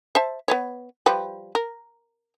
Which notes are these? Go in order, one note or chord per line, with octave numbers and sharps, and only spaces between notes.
C5 E5 A5
B3 B4 C#5
F3 G3 B4
A#4